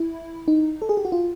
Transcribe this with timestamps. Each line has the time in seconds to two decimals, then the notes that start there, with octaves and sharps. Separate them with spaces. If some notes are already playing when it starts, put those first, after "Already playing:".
Already playing: E4
0.48 D#4
0.82 A4
0.89 G#4
0.97 G4
1.05 F#4
1.12 F4